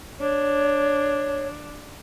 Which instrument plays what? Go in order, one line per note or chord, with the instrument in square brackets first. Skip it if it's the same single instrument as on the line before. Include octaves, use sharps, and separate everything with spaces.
[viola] D4 [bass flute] C#5